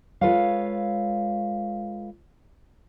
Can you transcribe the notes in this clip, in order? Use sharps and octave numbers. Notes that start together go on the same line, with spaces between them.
G#3 F4 A4 B4 C#5 F5